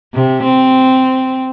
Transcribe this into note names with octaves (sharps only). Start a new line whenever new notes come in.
C3
C4